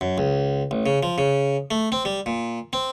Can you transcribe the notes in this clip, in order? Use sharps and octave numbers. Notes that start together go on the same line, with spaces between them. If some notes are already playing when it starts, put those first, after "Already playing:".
F#2
C#2
A1
C#3
F3
C#3
A3
C4
G3
A#2
C4